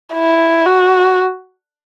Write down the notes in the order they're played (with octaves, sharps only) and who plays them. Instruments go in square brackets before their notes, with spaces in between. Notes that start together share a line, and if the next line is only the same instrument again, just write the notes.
[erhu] E4
F#4